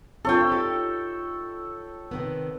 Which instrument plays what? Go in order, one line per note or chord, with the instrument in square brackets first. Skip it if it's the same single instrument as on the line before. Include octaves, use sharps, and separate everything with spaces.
[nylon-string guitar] C4 D4 F4 [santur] A4 C#5 G5
[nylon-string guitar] D#4 F4 G4
C3 D#3 B3